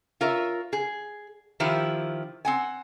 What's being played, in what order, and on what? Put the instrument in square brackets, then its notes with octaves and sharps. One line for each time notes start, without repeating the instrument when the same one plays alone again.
[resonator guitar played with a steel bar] F4 A#4 C#5 E5
G#4
D#3 F3 E4 G4
C4 F#5 G#5